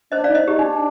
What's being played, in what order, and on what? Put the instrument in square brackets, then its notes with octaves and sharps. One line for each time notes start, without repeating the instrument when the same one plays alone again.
[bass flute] D4 [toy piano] C5 D#5
[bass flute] D#4 [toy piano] D5 F5
[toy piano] C5 D#5
[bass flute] D#4 [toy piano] G4
[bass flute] D4 [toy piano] D#4